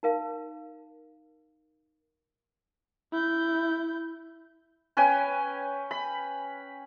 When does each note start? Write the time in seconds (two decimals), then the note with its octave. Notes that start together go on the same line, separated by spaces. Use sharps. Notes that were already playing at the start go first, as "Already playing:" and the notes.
0.03 D#4 A#4 F5
3.12 E4 G6
4.97 C#4 B4 G5 G#5
5.91 B5